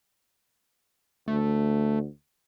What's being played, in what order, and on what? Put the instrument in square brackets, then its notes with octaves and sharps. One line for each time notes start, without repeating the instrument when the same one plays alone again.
[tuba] D2 [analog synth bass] A3